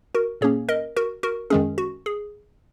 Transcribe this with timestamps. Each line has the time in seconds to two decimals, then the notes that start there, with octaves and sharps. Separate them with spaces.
0.15 F#4 A#4
0.41 A#2 A#3 C#4 G#4 C#5
0.69 A#4 D#5
0.96 F#4 A#4
1.23 F#4 A#4
1.50 F#2 D#3 G#3 C#4 G#4
1.78 F#4
2.06 G#4